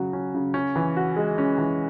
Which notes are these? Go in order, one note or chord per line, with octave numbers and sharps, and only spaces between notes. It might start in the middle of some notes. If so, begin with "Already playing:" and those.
Already playing: C#3 F#3 F#4
C#4
C#3
C#4
E3
F#4
G#3
C#4
E3